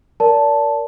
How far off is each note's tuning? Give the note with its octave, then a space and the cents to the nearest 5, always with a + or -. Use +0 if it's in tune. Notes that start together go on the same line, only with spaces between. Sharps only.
A#4 +0 D5 -30 A5 +0